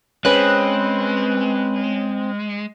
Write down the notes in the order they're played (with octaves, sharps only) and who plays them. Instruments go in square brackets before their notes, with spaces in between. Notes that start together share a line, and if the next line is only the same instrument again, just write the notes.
[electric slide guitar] G#3 [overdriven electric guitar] C4 [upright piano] C#4 [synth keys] B4 F#6